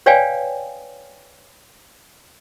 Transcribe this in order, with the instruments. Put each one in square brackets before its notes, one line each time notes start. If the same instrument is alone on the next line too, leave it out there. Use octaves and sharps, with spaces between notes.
[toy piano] B4 C#5 D5 F5 G5 G#5